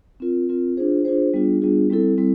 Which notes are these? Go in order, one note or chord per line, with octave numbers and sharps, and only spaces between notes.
C4 F4 A#4
C4 F4 A#4
D4 F4 G#4 C5
D4 F4 G#4 C5
G3 B3 D4 F4 G#4
G3 B3 D4 F4 G#4
G3 C4 E4 A4
G3 C4 E4 A4